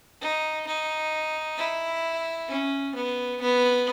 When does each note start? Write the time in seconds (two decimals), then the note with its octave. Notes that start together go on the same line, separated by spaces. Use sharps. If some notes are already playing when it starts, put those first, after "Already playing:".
0.21 D#4
0.67 D#4
1.58 E4
2.49 C#4
2.95 B3
3.41 B3